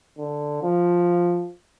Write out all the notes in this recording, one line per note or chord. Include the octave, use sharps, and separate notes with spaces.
D3
F3